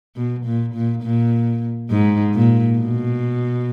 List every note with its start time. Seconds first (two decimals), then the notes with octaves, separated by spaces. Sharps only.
0.16 B2
0.45 A#2
0.74 A#2
1.03 A#2
1.91 G#2
2.34 A#2
2.78 B2